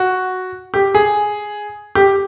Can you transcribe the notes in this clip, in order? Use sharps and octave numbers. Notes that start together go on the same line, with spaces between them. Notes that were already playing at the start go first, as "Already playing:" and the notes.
Already playing: F#4
G4
G#4
G4